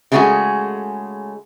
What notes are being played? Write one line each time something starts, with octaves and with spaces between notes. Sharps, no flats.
C#3 G#3 A3 D#4 F#4 G#4